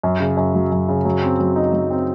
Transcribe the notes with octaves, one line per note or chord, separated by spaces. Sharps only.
F#2
C#3
F#2
F#3
F#2
C#3
F#3
C4
F#3
D#4
F#3
C4